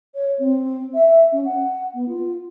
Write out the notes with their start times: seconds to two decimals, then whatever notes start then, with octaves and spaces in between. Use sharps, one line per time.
0.14 C#5
0.39 C4
0.94 E5
1.32 C#4
1.45 F#5
1.94 B3
2.08 F4